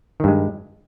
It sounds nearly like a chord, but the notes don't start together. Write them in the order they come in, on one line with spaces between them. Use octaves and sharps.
D#3 G2 G#3